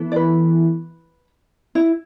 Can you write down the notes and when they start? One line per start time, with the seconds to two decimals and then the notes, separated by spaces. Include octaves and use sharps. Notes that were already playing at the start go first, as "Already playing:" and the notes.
Already playing: E3 B3 E4 A4
0.12 D5
0.16 B4
1.75 E4